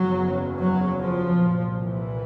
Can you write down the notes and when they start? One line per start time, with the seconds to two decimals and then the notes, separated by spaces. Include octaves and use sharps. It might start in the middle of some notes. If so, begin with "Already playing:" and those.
Already playing: F#1 E2 C#3 F#3
0.58 F#3
1.00 F3
1.42 C2 A#2
1.83 E3